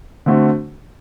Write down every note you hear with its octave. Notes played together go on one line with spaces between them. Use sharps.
D3 A3 C4 F#4